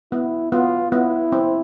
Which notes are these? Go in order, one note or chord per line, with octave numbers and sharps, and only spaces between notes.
B3 E4
B3 F4
B3 E4
C4